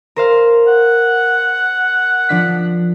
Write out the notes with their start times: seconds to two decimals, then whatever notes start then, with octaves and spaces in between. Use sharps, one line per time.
0.16 A#4 C5 F5
0.67 F#5
2.29 F3 D4 B6